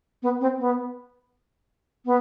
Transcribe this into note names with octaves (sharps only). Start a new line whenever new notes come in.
B3
C4
B3
B3